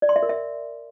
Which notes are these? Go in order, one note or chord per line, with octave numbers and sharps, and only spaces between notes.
D5
C6
E5
A#4
E5